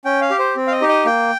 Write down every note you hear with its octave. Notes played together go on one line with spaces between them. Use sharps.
C#4 G5
F5
G4
C5
C4
F5
D#5
D#4 G4
D#5
A#3 G5